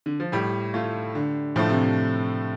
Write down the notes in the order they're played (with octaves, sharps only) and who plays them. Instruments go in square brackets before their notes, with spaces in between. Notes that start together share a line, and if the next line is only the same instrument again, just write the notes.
[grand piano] D3
F3
[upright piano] A2 [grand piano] G3
[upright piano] A3 F4
D3
[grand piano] A2 [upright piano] F3 A3
[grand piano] C3